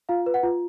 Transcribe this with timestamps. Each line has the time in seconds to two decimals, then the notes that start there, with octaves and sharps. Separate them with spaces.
0.09 F4 F5
0.26 B4
0.34 F#5
0.43 F4